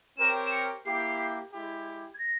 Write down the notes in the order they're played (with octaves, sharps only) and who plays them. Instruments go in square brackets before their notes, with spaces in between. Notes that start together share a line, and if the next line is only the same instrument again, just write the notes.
[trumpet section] C4 G4 A#4 C#5 [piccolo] E7
[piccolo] E7
C#7
[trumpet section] A#3 E4 G4 [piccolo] C7
[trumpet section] G#3 E4 G4
[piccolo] G#6
A#6